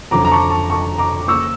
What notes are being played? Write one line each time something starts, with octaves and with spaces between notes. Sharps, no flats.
F2 D3 F3 C#4 A#5 D6
A#5
A5 C#6
A5 C#6
A5 C#6
A#5 D6
C#3 F3 A#3 C#6 E6